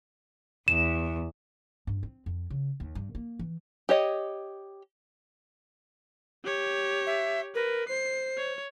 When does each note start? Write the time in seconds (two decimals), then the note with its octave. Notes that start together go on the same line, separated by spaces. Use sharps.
0.68 E2 E7
1.87 G2
2.03 C4
2.26 F2
2.50 C#3
2.80 D#2
2.95 G2
3.15 A#3
3.39 E3
3.89 G4 C#5 D#5
6.44 G4 C#5
7.07 E5
7.55 A#4 B4
7.89 C5 C7
8.37 C#5